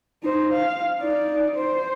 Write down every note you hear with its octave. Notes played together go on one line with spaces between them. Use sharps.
D#4 C5
F5
D#4 D5
C5